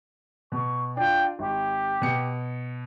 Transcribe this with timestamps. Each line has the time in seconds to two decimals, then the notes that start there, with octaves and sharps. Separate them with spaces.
0.52 B2 C#6
0.97 D4 F4 G5
1.39 G#1 G4
2.02 B2 C#7